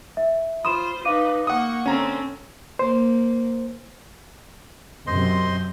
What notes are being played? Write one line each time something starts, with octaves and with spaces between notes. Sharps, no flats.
E5
F4 C5 B5 C6 D#6 E7
D#4 B4 F5 D6 D#7
A#3 F#5 C#6 D#6
D3 C4 C#4 A#5
A#3 C5
F#2 C3 C5 D#5 C6